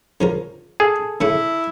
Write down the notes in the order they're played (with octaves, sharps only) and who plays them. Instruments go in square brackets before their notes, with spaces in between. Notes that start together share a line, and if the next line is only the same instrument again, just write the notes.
[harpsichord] C#3 F3 A#4
[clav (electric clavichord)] G#4 [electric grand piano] A4
[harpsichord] C#3 A3 F#5 [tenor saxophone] E4